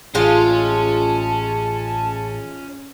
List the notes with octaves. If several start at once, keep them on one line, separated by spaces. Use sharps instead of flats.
A1 G#3 C#4 F4 A5